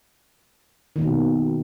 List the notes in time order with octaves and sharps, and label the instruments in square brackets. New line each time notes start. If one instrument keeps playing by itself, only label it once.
[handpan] D#3
A#3
B2